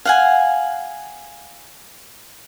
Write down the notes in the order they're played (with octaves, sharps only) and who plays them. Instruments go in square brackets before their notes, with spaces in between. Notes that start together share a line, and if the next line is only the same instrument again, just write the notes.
[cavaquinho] F5 F#5 G#5